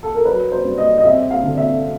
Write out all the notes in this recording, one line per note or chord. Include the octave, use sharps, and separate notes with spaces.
A4
A#4
F#3 B4
C5
G2
D#5
D#5
C4 E5
F5
D3
E5